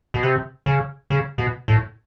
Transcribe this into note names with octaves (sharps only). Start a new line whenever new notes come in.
B2
C3
C#3
C#3
B2
A2